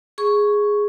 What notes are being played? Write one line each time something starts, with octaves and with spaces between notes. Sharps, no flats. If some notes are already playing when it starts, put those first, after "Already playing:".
G#4 C#6